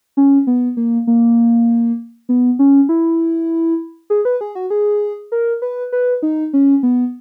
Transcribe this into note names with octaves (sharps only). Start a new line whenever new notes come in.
C#4
B3
A#3
A#3
B3
C#4
E4
G#4
B4
G#4
F#4
G#4
A#4
B4
B4
D#4
C#4
B3